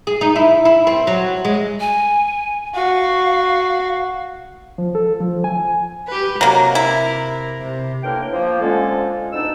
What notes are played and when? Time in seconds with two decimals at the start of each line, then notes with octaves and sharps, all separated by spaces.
0.07 G#4
0.21 D#4
0.36 E4
0.65 E4
0.87 C4
1.07 F#3
1.45 G#3
1.80 G#5
2.75 F#4 F5
4.78 F3
4.95 A4
5.20 F3
5.44 G#5
6.08 G4 B4
6.41 C3 F#3 A#3 A#4
6.75 E4
7.61 C3
8.03 A2 D3 A#3 A#4 B4 G5
8.32 F3 A#3
8.61 D3 F3 G#3 C#4 F4 A4
9.32 D2 B2 D4 D#4 E6